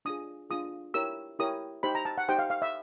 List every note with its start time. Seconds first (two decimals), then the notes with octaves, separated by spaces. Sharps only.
0.05 D4 F4 G#4 D#6
0.50 D4 F4 G#4 D#6
0.94 E4 G4 A#4 C#5 E6
1.39 E4 G4 A#4 C#5 D#6
1.83 D#4 G4 C5 B5
1.95 A#5
2.05 A5
2.18 F#5
2.28 D#4 G4 C5 G5
2.39 F5
2.50 F5
2.62 E5